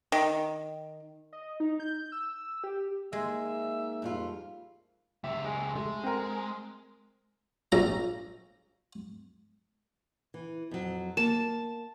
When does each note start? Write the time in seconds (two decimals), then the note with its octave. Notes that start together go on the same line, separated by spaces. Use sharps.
0.12 D#3
1.33 D#5
1.60 D#4
1.80 G6
2.12 E6
2.64 G4
3.13 G#3 A#3 D#4 E5
4.02 F2 G3 F4
5.24 C#2 G4 E5
5.44 G#3
5.76 G#3 A3
6.04 C4 A#4
7.72 A#1 A#5
10.34 E3
10.71 F2 F#3
11.17 A#3 A5